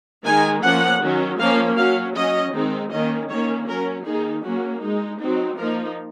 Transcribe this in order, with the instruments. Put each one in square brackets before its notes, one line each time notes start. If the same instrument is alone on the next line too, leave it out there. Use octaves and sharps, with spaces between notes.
[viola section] D#3 G#3 D#4 G#5
F3 A#3 C#4 F#5
D#3 F#3 C#4
F3 A#3 C#4 F5
F#3 C#4 F5
F#3 C#4 D#5
D#3 G#3 C4 D#4
D#3 A#3 C#4 D#5
D#3 A#3 C#4 C#5
F#3 C#4 A#4
D#3 A#3 D#4 G#4
F#3 A#3 C#4 F#4
G#3 D#4
F#3 C4 D#4
F3 A#3 D#4 A#4